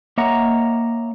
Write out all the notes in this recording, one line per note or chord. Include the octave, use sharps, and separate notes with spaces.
A#3 C#5 D#5 E5 F#5 A#5